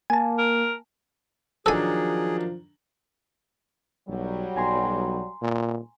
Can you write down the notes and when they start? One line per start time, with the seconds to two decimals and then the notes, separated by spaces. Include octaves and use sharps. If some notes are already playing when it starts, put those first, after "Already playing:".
0.10 A#3 G#5 A5
0.38 A#4
1.66 D#3 F3 F#3 D4 G#4 A4 G#5
4.09 B1 F#3 G3
4.56 B1 G#5 A#5 C6
5.42 A#2